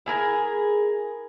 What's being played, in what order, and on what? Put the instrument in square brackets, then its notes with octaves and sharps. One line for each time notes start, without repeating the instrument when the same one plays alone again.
[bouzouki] E4 G#4 A#4 G#5